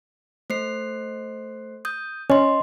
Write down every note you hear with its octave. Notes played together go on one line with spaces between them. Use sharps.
A3 C5 C7
D#6 G6
C#4 D#5 C6